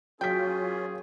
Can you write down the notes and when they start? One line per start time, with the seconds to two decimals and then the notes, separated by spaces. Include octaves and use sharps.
0.21 F#3 A#3 C#4 F4 G#4 G5 B6